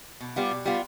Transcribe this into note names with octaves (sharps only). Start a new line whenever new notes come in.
B2
G3 B3 F4
B2
G3 B3 F4